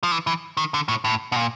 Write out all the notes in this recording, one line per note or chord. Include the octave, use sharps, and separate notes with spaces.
F3
E3
E3
D#3
D3
A2
A2
B2
A#2